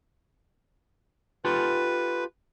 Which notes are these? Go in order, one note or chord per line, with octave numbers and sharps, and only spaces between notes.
F4 G4 A4 B4